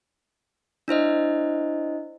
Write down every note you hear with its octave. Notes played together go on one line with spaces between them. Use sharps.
D4 E4 C5 D#5